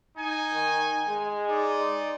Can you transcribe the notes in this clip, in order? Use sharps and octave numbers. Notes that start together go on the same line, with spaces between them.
D#4 G#5
D#3
G#3
D#4 D5